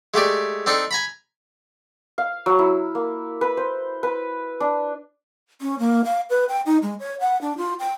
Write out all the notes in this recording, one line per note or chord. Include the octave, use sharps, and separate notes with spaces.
G#3 A3 G4 D5
C4 D4 D#4 A4
G#5 A#5 B5
F5
F#3
E4
A#3
B4
C5
B4
D4
C#4
A#3
F5
B4
G5
D#4
G#3
C#5
F#5
D4
F4
G5